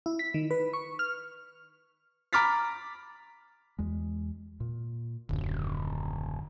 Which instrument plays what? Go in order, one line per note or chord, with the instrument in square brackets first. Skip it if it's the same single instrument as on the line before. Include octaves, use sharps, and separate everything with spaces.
[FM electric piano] E4
B6
D#3
B4
C#6
F6
[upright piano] A#5 B5 D6 F6 A6 B6
[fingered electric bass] E2 G#3
A#2
[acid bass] D#1 [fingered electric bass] F#2 D3